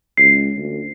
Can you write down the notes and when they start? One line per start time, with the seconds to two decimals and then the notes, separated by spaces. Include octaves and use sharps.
0.18 C#2 C7
0.57 D2